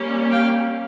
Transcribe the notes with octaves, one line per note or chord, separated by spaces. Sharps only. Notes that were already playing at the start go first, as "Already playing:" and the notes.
Already playing: G3 A#3 C#4
F5 G5